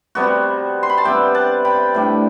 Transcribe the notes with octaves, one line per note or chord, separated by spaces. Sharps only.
C3 G3 B3 F#4
C6
B5
A5
C3 G3 B3 E5 G5
F#5 A5
G5 B5
A2 G3 D4